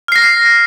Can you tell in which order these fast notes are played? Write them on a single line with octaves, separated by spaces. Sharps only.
F6 C7 A#6